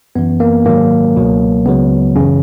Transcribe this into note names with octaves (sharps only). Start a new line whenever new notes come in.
F#2 E3 B3
A#3
G#2 D#3 F#3 A#3
C#2 B2 F#3
C#2 C#3 F#3 B3
F#2 C#3 E3 C#4